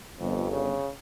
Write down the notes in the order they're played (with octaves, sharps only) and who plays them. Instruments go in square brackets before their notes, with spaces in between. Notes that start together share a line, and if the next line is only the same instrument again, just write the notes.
[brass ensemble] G1 [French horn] F2
[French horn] C#3